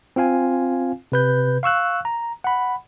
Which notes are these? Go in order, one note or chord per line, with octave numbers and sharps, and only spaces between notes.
C4 F4 F5 G#5
C3 B4 G6
F5 C#6 E6 F#6
A#5
F#5 B5